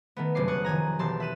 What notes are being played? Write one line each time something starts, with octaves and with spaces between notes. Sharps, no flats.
D#3 A3 B3
F#1 G2 C3 C#4 D6 C7
C#6 D#6 F#6 A6 C#7
F1 D#3 G#5 A#5
E1 G4 A5 C6 E6 A6
E5 F#6 D#7 E7